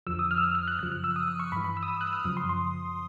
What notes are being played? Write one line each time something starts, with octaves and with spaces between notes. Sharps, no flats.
F2 D3 F3 E6
D#6
F6
E6
F6
F6
F#6
F#2 C#3 F3 F#6
F6
E6
D#6
D#6
C#6
G2 E3 B5
B5
E6
D#6
E6
F#6
E6
F6
F#2 C#3 F3 D#6
C6
C6